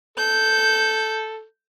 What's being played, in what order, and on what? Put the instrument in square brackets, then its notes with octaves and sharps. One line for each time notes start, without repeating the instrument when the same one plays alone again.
[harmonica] A4 [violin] G6